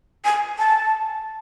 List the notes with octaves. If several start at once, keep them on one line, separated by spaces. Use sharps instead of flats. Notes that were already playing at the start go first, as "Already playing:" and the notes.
G#5
A5